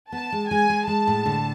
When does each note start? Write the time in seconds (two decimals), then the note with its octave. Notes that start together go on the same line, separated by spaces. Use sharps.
0.12 B3 A5
0.32 G#3
0.51 G#3 G#5
0.70 G#3
0.87 G#3 A5
1.07 A2
1.26 D3